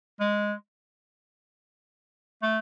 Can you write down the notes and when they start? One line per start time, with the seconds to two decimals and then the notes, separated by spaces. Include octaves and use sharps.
0.20 G#3
2.42 A3